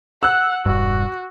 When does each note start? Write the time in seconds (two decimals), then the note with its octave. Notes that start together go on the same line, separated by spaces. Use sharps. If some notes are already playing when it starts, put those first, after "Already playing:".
0.23 F#5 E6 F#6
0.66 E1 G2 F#4